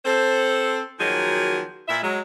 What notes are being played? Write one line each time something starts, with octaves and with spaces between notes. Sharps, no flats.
C4 A4 C5
D#3 F3 F#3 A#3 F#4 G#4
A#2 E4 E5
F#3 G#3